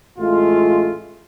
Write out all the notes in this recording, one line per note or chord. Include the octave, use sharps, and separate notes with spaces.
A1 G#3 A3 F4